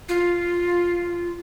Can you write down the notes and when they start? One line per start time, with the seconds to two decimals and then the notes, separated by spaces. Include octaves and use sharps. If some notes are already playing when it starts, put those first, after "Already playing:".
0.09 F4